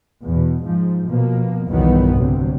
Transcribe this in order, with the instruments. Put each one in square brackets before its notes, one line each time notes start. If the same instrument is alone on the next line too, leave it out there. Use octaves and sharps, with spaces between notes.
[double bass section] E2 B2
G#2 F3
B2 F3 A#3
B1 E2 G2 D#3 F#3 B3
D2 C3 F#3